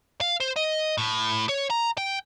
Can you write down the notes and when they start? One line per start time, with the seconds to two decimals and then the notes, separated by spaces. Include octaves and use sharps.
0.21 F5
0.40 C5
0.56 D#5
0.98 A2
1.49 C#5
1.70 A#5
1.98 G5